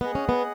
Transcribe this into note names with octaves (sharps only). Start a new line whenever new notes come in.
B3 G#4 D#5 F#5
C#4
B3